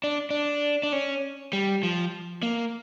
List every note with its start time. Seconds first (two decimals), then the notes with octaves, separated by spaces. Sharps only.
0.04 D4
0.30 D4
0.83 D4
0.93 C#4
1.53 G3
1.83 F3
2.43 A#3